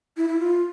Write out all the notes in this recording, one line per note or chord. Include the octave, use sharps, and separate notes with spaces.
E4
E4
F4